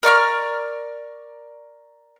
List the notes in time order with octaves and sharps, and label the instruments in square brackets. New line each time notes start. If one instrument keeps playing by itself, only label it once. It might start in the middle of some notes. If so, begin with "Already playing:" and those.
[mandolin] A#4 D5 C#6 F6